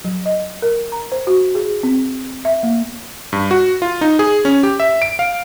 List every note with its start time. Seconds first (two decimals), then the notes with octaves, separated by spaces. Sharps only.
0.04 F#3
0.26 D#5
0.62 A#4
0.92 A#5
1.12 C5
1.27 F#4
1.55 G#4
1.83 C4
2.45 E5
2.63 A#3
3.33 G2
3.51 F#4
3.82 F4
4.01 D#4
4.19 G#4
4.45 C#4
4.63 G4
4.80 E5
5.02 D7
5.19 F5